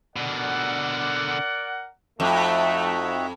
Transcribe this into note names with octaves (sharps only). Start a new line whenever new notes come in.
B2 D3 A#4 D5 F#5
F2 A3 D#4 F#4 E5